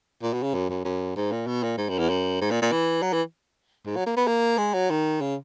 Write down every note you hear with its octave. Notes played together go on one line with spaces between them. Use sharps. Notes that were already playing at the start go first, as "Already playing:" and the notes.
A#2
B2
C#3
F#2
F#2
F#2
G#2
A#2
B2
A#2
G#2
F#2
E2
F#2
G#2
A#2
A#2
E3
F#3
E3
G#2
F#3
A#3
B3
A#3
G#3
F#3
D#3
C#3